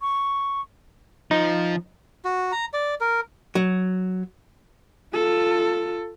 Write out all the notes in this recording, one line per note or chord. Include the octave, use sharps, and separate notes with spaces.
C#6
F3 D#4
F#4
A#5
D5
A#4
F#3
F4 A4